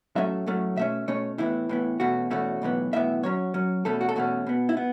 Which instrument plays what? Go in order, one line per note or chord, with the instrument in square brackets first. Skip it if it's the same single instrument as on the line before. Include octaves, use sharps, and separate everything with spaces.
[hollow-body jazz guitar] A2 F#3 A3 C#4 E5
A2 F#3 A3 C#4
B2 A3 C#4 E5
B2 A3 C#4 C#5
A2 E3 B3 E4
A2 E3 B3
E2 B2 A3 C#4 F#4
E2 B2 A3 C#4 F#4
B1 A2 E3 B3
B1 A2 E3 B3 E5
F#2 F#3 C#4 C#5
F#2 F#3 C#4
E2 B2 A3 C#4 A4
F#4
A4
E2 B2 A3 C#4 F#4
B2 B3
E4
B3